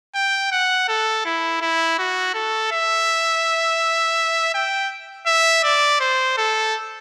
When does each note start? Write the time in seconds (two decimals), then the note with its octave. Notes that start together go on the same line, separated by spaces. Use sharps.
0.15 G5
0.52 F#5
0.88 A4
1.25 E4
1.61 E4
1.99 F#4
2.34 A4
2.72 E5
4.54 G5
5.27 E5
5.64 D5
6.00 C5
6.37 A4